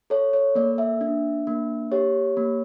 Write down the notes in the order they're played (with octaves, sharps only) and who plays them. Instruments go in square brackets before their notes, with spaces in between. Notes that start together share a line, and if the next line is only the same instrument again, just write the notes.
[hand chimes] A4 C#5
C#5
A#3 D5
E5
D4
A#3
G4 C#5
A#3